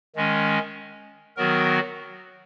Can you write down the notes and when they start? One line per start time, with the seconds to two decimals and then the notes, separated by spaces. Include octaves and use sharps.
0.16 D#3 G#3 C#4
1.36 D#3 F#3 B3 F#4 A#4